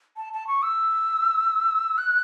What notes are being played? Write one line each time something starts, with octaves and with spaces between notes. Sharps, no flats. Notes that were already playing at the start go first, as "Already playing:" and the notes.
A5
A5
C#6
E6
F#6